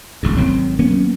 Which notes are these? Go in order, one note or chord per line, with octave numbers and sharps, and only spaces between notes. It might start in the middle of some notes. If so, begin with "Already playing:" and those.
E1 C#2 G#2
G#1 D#3 F#3 C4
F#3 A#3 B3 C#4